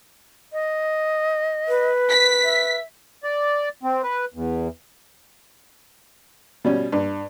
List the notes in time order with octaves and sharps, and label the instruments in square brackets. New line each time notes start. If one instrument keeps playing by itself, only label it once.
[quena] D#5
[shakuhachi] B4
[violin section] B6
[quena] E5
[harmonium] D5
C4
B4
E2
[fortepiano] B2 G3 C#4
G2